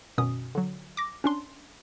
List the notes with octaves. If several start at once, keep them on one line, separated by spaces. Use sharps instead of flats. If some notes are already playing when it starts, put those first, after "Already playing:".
G#1 F#2 B2 C#4 D#6
D3 F#3
D6 A#6
C#4 D4 C6